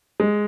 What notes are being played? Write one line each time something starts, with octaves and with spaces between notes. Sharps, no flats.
G#3